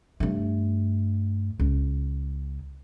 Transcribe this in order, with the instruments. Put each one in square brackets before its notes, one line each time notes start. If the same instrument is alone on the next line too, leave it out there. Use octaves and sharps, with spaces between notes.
[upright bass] G2 A3
C#2